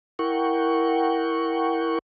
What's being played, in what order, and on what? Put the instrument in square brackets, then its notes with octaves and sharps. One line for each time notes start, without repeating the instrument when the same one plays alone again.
[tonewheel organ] E4 A#4 F#5 G5 C#6